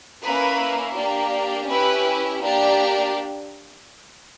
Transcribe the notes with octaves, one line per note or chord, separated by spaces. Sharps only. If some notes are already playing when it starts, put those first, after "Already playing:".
A#3 C#4 E4 B4
A#3 D4 G4
C#4 E4 G4 B4
A#3 D4 G4